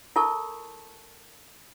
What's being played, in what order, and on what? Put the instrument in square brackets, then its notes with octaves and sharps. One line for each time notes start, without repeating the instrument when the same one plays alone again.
[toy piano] E4 A4 A#4 A5 C#6